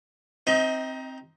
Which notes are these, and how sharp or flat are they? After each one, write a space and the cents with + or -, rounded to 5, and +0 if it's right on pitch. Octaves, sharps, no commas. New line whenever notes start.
C4 +5 D#4 +5 D#5 +35